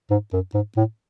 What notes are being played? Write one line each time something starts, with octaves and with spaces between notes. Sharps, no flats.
G#2
F#2
G#2
A2